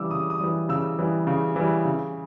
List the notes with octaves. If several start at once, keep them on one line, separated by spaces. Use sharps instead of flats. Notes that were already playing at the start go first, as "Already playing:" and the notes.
Already playing: C#3 E3 G3 D6 E6
C#3 D#6
D#6
E3 G3
C#3 E6
E3 G3
C#3
E3 G3
C#3